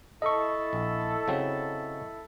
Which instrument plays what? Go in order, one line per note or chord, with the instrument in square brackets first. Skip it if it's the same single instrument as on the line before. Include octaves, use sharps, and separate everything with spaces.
[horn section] E4 A4 [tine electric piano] D#5 C#6
[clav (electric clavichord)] A#1
C#3 F#3 C4